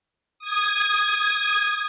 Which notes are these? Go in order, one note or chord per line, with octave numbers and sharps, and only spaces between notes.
D#6 G#6